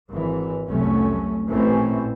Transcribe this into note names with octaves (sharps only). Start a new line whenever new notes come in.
G#1 E3
F1 C2 F#3 A3 C#4
A1 A#2 E3 A3 C4 C#4